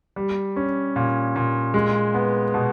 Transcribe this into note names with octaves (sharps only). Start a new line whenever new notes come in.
G3
C#4
A#2
A#2
G#3
B3
B2